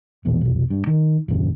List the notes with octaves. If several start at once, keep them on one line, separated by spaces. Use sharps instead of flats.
E1 A#1 E2
F1 B1
G2
D#3
D#1 G#1 F#2 C#3